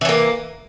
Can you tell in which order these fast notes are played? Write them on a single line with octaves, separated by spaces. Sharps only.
E3 C#4 A#3